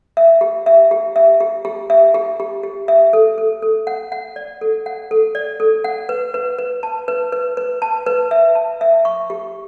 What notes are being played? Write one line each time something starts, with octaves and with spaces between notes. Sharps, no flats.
E5
G4
E5
G4
E5
G4
G4
E5
G4
G4
G4
E5
A4
A4
A4
F#5
F#5
D5
A4
F#5
A4
D5
A4
F#5
B4
B4
B4
A5
B4
B4
B4
A5
B4
E5
A5
E5
C#6
G4